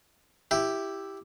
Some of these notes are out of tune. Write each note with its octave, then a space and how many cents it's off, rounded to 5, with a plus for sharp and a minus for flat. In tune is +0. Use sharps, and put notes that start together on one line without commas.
E4 +0 G4 +0